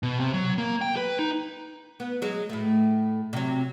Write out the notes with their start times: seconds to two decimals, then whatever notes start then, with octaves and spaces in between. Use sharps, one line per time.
0.03 B2
0.20 C3
0.34 F#3
0.58 A#3
0.81 G5
0.97 B4
1.19 D#4
2.00 B3
2.22 F#3 G#3
2.49 A2 A3
3.33 C3 F#3